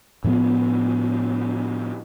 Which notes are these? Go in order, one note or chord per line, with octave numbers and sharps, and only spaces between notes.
A2 F3 A3 B3